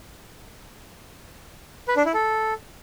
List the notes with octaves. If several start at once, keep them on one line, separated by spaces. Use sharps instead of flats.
B4
D4
E4
A4